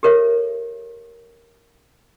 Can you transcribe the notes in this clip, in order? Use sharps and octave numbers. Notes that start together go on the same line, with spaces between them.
G4 A4 A#4 C#5 E5